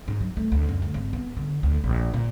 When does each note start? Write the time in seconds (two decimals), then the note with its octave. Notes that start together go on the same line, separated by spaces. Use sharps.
0.08 G#2
0.21 F#3
0.37 A3
0.52 D2
0.69 F#2
0.82 D2
0.94 G#1
1.13 B3
1.37 D3
1.63 D2
1.84 A#1
2.14 A#2